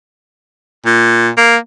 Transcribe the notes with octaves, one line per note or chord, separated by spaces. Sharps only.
A#2
A#3